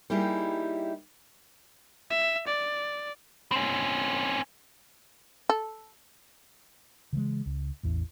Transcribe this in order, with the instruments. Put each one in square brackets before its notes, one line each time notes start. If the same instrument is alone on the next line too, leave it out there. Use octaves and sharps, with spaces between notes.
[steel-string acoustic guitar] G3 A#3 D#4 E4 G4 G#4
[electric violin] E5
D5
[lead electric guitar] C4 C#4
[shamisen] A4
[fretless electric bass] C#3 E3 F#3 G#3
C#2
A1 E2 E3